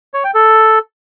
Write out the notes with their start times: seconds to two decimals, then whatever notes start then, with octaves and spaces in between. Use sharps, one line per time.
0.14 C#5
0.24 G5
0.35 A4